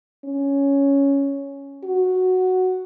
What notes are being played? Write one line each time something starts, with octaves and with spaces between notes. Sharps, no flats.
C#4
F#4